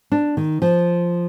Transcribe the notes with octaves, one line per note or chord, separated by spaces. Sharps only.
D4
D#3
F3